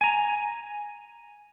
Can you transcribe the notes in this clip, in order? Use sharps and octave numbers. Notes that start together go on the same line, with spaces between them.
G#5 A#5